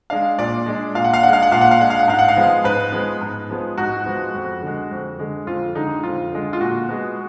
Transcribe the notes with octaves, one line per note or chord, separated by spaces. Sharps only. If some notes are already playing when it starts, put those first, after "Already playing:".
G#3 D4 F5
A#2 D5
G#3 D4
A#2 F5
F#5
F5
G#3 D4 F#5
F5
F#5
A#2 F5
F#5
F5
G#3 D4 F#5
F5
F#5
G#2 F5
F#5
F5
F3 G#3 B3
G#2 B4
F3 G#3 B3
G#2
F3 G#3 B3
G#2 F#4
F3 G#3 B3
F2
D3 G#3
F2
D3 G#3
F2 F4
D3 G#3 D#4
F2 F4
D3 G#3
F4
A#2 F#4
G#3 B3